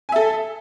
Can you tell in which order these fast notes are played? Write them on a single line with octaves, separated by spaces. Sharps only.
G#5 E5 A4